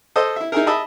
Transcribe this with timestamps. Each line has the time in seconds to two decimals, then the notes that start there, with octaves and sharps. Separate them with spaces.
0.16 A4 C5 D#5
0.36 E4 E5
0.52 D#4 E4 G#4 A#4
0.67 D#5 E5 A5 B5